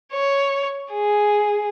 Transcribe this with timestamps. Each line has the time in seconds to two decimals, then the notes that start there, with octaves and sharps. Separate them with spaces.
0.13 C#5
0.93 G#4